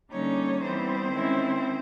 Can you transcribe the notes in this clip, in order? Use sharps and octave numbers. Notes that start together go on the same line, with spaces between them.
D3 G3 A#3 C#4 D#4 C#5
E3 G3 B3 C4 C5
D#3 G#3 C#4 E4